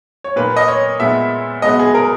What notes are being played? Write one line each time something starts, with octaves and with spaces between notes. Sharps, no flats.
C#5
A#2 A#3 B4
D#5
C#5
A#2 G#3 B3 E5
B2 G#3 B3 D#5
G#4
A#4